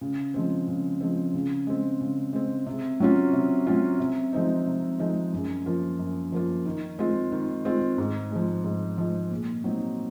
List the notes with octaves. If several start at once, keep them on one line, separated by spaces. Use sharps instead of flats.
C#3
F3 G#3 C4
C#3
F3 G#3 C4
C#3
G#3 C4
C#3
G#3 C4
C3
F#3 C#4 F4
C3
F#3 C#4 F4
C3
F3 G#3 C4 D#4
C3
F3 G#3 C4 D#4
F#2
F3 A#3 F4
F#2
F3 A#3 F4
D#3
G#3 C4 F4
D#3
G#3 C4 F4
G#2
F3 G#3
G#2
F3 G#3
A#2
F#3 C4 D#4